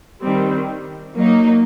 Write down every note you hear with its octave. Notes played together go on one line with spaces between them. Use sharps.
D#3 G3 C4
F#3 A#3 D#4